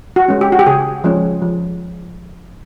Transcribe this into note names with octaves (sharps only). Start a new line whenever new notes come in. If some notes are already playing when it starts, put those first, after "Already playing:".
F#4
G#3 C#4
G4
F#4
G4
C#3 G#4
F3 G#3 C#4
F3